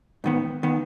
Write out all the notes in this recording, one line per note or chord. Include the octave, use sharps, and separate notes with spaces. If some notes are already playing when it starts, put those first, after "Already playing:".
G#2 D#3 B3
D#3 B3